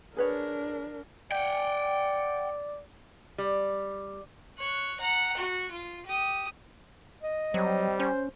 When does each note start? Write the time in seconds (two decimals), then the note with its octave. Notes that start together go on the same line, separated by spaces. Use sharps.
0.17 D4 G#4 A#4 B4 C#5
1.32 D5 F#5 G5
3.38 G3
4.59 C#5 F#6
5.00 F#5 A#5
5.37 F#4
5.71 F4
6.06 G4 D#6
7.23 D#5
7.54 F#3 G3 C4
8.00 C#4 C5